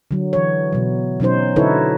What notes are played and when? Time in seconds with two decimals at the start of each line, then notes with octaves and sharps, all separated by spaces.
0.11 D3 F#3
0.33 E3 C#5
0.73 B2 F#3
1.20 B2 F#3 C#4 D#4 C5
1.56 D3 D#4 E4 A4 B4 C#5